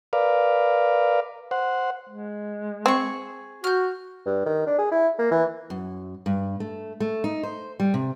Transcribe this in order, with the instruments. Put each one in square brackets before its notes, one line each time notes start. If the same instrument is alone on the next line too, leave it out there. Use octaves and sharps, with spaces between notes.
[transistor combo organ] A#4 B4 D5 F5
C5 F#5
[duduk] G#3
[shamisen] C4 [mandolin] G#4 C#6
[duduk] F#4 [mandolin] F6 G6
[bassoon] G2
D#3
D4
G#4
E4
A#3
E3
[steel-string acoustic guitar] F#2
G2
A3
A3
D#4
C5
G3
C3